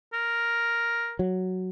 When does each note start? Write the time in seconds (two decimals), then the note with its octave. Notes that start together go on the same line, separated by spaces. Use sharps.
0.13 A#4
1.19 F#3